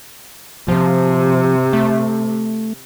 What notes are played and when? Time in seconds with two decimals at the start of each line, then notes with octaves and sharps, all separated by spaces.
0.68 C3 F3
1.73 A3